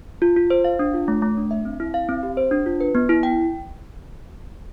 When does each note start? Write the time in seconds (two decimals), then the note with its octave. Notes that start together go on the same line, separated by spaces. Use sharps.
0.22 F4
0.36 F4
0.50 C5
0.65 F5
0.79 D4
0.94 F4
1.08 A3
1.22 A3
1.37 D4
1.51 E5
1.65 C4
1.80 E4
1.94 F5
2.09 C4
2.23 G4
2.37 C5
2.51 D4
2.66 F4
2.80 B4
2.95 B3
3.09 E4
3.23 G5